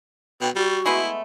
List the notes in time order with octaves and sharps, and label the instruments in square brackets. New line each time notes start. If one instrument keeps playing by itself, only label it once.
[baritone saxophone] B2 [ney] G5
[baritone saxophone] G3 [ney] F#4
[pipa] G#3 A3 B3 [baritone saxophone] E4